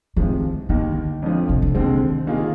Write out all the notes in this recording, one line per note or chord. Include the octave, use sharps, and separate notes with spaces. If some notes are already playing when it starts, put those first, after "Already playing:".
C3 D#3 F3 G#3
D#2 D3 D#3 A#3
F2 D3 F3
C3
D3
D#2 D3 D#3 G#3 C4
D#3 A#3 F4 G#4